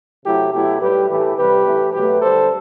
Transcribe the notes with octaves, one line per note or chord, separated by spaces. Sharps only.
C3 F#3 A3 E4 G4
B2 F#3 A3 E4 G4
A2 G3 G4 B4
A2 E3 A3 G4 B4
C3 G3 G4 B4
A2 E3 A3
B2 F#3 A3 G4 B4
D3 G3 A4 C5